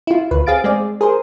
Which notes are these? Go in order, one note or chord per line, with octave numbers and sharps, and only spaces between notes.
E4 F4
D2 B4
C4 G#4 F5 A6 D7
G#3 C4 G#4 D5
G#4 A#4 C5